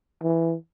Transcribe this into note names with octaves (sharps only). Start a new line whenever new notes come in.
E3